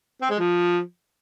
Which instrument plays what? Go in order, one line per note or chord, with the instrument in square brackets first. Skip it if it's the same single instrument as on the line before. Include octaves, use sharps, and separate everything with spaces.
[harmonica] C4
G#3
F3